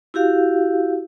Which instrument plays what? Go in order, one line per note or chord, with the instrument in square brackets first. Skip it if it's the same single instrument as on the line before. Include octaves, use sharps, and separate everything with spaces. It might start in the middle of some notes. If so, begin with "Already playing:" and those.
[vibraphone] E4 F#4 G4 F5